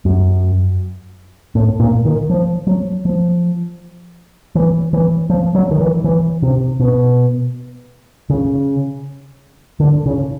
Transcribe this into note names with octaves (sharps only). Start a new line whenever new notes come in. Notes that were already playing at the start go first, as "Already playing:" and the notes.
F#2
A2
A#2
D#3
F3
F#3
F3
E3
E3
F3
F#3
D#3
E3
E3
C3
B2
C#3
D3
C#3